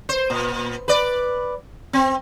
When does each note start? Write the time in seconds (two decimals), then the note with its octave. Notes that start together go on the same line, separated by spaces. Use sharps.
0.09 C5
0.30 A#2
0.88 B4 D5
1.93 C4